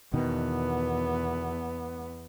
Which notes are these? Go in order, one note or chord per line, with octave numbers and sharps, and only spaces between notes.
E2 B2 D#3 B3